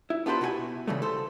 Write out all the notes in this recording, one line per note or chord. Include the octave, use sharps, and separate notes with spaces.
E4
B3 D4 F4 G4 B4 C5
B2 E4 F#4 C5 G#5
C#3 E3 G3 A3
A4 C5